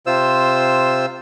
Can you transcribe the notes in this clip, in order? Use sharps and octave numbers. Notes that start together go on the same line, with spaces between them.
C3 F4 C5 E6